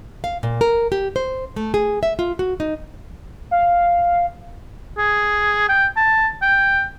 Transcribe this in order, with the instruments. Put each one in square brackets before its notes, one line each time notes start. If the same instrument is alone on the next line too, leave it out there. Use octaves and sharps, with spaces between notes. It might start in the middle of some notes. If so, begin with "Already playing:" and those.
[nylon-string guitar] F5
A#2
A#4
G4
C5
A3
G#4
E5
F4
F#4
D#4
[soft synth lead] F5
[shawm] G#4
G5
A5
G5